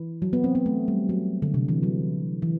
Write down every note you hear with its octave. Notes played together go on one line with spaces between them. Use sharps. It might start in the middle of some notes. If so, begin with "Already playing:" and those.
Already playing: E3
F#3
B3
C4
B3
A3
G3
F#3
D3
C3
E3
F#3
E3